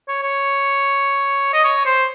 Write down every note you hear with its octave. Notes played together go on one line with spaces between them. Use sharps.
C#5
C#5
D#5
C#5
C5